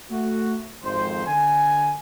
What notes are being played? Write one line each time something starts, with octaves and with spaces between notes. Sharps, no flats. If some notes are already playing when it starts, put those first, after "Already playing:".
A3 F#4
G#1 F2 C5
D3 G#5